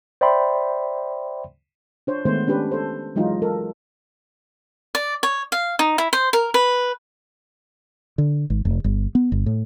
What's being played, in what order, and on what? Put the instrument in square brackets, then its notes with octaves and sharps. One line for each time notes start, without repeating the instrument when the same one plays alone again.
[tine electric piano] C5 D5 E5 G5 B5 C6
[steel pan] D4 C5 C#5
D#3 G#3 A3 B3 C5
C#4 D4 G4 B4
A4 C5
E3 F#3 G#3 D#4 F4
A4 A#4
[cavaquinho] D5
C#5
F5
D#4
E4
C5
A#4
B4
[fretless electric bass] D3
G#1
F1
G1
B3
G1
A2